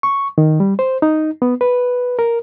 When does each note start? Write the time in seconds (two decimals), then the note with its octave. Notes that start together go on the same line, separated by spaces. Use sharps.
0.03 C#6
0.38 D#3
0.60 G3
0.79 C5
1.02 D#4
1.42 B3
1.61 B4
2.19 A#4